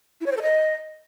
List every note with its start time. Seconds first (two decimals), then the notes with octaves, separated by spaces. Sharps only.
0.21 E4
0.26 C#5
0.31 C5
0.37 A4
0.42 D#5